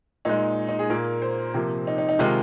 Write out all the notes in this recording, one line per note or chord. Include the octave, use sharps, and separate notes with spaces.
A#2 G#3 D#4
D#4
G#4
A#2 A#3 A#4
C5
C3 F3 A#3
D#4
D#4
D#4
C3 D#3 G#3 F4